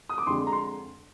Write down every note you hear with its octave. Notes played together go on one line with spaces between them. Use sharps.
D#6
D6
F2 D3 G#3 D4 C6
A#5
C6